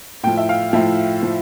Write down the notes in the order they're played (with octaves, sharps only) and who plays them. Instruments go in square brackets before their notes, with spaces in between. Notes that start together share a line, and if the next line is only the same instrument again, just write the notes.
[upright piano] A2 F3 G5
E5
F5
A2 F3 E5
F3